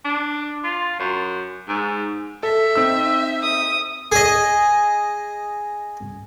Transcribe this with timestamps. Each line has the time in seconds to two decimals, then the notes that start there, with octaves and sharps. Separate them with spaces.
0.05 D4
0.64 F4
0.99 F#2
1.68 G#2
2.43 A4 E5
2.75 C4 D#4 E6
3.43 D#6
4.12 G#4 D#5